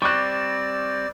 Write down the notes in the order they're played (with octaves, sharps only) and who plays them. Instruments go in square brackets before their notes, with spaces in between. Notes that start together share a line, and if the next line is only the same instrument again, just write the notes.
[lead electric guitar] G3 C4 [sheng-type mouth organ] D5 [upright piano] C#6 D6 F#6